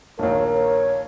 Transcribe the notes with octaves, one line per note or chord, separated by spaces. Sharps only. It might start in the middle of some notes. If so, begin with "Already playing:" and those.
A#1 D#2 A#4 C#5
C#5